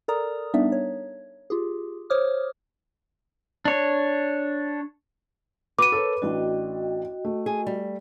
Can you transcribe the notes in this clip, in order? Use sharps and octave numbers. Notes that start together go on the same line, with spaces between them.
A4 A#4 D5 A#5 D#6
G3 B3 D4 D#4 D5 E5
C#5
F4 G4 G#4
C5 C#5 D6 D#6 F6
D4 C#5
F#4 B4 D6 D#7
A4 A#4 C#5
A1 D4 F#4 D#5 G5
A3
G#4
G3